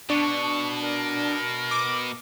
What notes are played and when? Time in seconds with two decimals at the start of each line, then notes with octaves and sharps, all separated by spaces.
0.10 B2 D4 C#6
0.82 A#4
1.71 D6